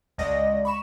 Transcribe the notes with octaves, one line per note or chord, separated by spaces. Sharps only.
C#2 G#3 D5 D#5 A#6
B5 C#6 E7